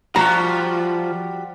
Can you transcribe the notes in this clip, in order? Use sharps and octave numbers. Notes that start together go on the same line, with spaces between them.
F3 G3 F4 F#4 A#5